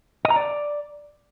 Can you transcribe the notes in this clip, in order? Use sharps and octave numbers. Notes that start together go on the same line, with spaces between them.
D#5
A#5
D5